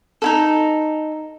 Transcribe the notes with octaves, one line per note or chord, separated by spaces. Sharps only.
D#4 E4 A4